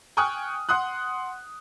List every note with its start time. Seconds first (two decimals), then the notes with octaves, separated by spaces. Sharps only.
0.17 G5 G#5 C#6 D#6 F6 F#6
0.69 F#5 C6 D#6 F#6